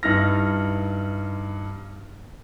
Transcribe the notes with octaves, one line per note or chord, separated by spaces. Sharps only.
G2 D#4 E4 F6 A#6